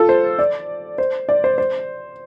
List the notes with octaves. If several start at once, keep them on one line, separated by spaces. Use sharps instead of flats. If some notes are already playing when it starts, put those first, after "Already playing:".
Already playing: F4 A4
C5
D5
C5
D5
C5
C5